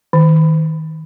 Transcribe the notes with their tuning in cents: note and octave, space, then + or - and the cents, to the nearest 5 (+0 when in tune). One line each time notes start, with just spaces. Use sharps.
D#3 +25